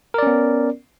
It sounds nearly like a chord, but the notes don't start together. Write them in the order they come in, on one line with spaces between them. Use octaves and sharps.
A#4 D5 C#4 B3